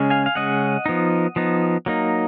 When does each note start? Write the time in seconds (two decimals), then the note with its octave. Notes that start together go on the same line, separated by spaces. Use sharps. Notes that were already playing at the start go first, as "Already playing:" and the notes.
Already playing: C#3 G#3 C#4
0.10 F5 G#5
0.26 F5
0.35 C#3 G#3 C#4 D#5 F#5
0.86 F3 B3 D#4
1.36 F3 B3 D#4
1.86 F#3 A#3 D#4